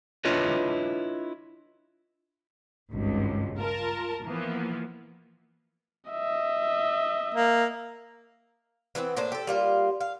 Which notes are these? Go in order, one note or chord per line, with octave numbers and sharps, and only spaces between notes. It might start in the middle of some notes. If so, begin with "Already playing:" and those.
D4 E4 F4 B4 C#5 D#5
G#1 C#2 G2
F4 A#4 A5
E3 F3 A#3 B3
D#5 E5
A#3
E3 A3 B3 C4
A2 A#3 D4 C5
G4 A4
G3 A#3 F4
F5